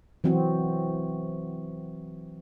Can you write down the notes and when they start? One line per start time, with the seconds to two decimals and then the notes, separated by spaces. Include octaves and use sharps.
0.24 E3 F#3 C4 F#4